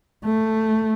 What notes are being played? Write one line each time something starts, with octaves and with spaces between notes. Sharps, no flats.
A3